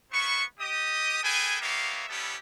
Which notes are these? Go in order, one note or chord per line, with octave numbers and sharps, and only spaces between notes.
B3 E4 C5 C#6
G4 D#5 D#6
G#4 A4 B4 G5 G#5
A#3 B3 G4 C#5 E5 F5
G3 B3 C#4 E4 G4 A4